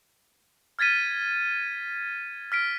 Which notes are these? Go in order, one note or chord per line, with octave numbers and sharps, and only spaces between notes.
F6 G#6 A6 B6 D#7
F6 B6 D7